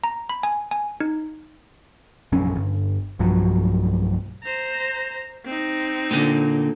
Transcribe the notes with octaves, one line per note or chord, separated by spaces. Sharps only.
A#5
B5
G#5
G#5
D#4
A#1 F#2 C3 C#4
G1
B1 G2 F3 F#3
C5 A#5
C4 D#4
A#2 D3